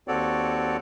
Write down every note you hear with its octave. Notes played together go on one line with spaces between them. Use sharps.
D#2 C4 F#4 A4 C#5 D5